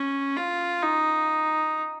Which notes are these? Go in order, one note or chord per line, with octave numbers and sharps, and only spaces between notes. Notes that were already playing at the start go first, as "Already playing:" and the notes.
Already playing: C#4
F4
D#4